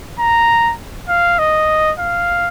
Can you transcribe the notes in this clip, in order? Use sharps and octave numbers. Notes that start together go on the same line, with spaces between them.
A#5
F5
D#5
F5